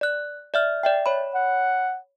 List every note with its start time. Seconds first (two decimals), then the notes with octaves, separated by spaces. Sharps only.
0.01 D5 F#6
0.54 D5 E5 F6
0.83 D5 E5 G5
1.06 C#5 B5
1.34 F#5